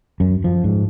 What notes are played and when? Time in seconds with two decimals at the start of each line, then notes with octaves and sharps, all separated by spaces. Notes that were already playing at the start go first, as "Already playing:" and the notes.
0.20 F#2
0.44 F3
0.64 G#2